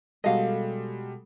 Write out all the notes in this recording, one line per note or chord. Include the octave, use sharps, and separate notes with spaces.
B2 G3 G#3 F#4 A4 D#5 F5